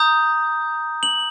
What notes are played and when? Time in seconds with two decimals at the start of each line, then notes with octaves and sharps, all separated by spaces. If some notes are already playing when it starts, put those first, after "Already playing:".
Already playing: A#5 D#6 G6
1.03 F#7